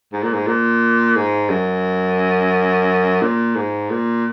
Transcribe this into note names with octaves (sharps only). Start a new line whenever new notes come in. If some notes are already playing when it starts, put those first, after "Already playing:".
G#2
A#2
G#2
A#2
G#2
F#2
A#2
G#2
A#2